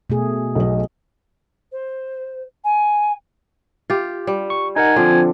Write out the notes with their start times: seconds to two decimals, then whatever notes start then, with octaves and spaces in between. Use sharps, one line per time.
0.10 B2 A3 G#4
0.55 B1 D#5
1.72 C5
2.64 G#5
3.90 F4 G4
4.27 G3
4.50 C#6
4.76 D#4 A#4 F#5 G#5
4.96 D3 F3 C4 F4